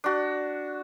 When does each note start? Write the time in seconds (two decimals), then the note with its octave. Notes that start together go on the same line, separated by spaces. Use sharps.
0.04 D4 F#4